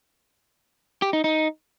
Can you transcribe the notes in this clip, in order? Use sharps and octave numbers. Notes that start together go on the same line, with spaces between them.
G4
D#4
D#4